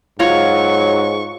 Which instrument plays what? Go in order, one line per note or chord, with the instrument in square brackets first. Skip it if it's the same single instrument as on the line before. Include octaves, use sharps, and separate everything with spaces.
[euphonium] G#2 [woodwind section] F#3 [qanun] F4 C#5 A#5 [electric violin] C#6